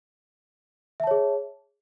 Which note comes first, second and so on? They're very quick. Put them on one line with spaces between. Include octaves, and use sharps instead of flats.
E5 A5 C#5 G#4